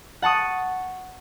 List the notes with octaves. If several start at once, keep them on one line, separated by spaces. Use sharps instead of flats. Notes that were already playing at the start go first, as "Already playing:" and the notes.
F#5 A5 C#6 D#6